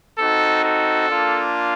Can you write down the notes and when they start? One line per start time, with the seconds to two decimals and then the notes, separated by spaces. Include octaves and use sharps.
0.18 C4 D#4 F#4 A4
0.64 A4
1.09 A#3 D4 F4